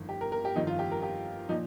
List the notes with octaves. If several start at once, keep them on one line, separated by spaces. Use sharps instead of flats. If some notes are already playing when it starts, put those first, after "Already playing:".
Already playing: G1 F2 D#3
G4
A#4
A#4
G4
G1 F2 D#3 D#4
F4
G4
A#4
G4
A#2 F3 D#4